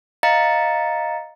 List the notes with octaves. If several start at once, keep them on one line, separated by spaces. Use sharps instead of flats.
D#5 F5 A#5 A6 C#7